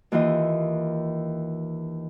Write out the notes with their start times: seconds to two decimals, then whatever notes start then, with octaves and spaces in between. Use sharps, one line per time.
0.12 D#2 E3 F4 D#5